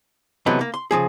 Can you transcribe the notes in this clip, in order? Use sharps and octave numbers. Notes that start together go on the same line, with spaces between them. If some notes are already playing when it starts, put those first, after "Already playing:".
C3 E3 F#3 A3 B3 D#4
A#3
C6
C#3 F3 G#4